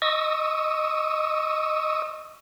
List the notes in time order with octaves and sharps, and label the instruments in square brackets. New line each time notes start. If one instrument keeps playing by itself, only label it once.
[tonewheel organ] D#5 C#6 D#6 E6